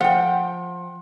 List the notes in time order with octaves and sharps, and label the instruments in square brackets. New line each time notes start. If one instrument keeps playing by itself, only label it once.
[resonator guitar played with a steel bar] F3 G5 [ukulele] F#5